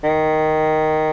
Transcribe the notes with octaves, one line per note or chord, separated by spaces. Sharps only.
D#3